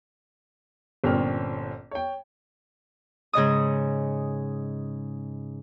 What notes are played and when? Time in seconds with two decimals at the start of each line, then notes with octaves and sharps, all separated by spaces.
1.04 G1 A#2 C4 C#4 F6
1.91 C#5 G5
3.33 G#2 C#3 D#5 D#6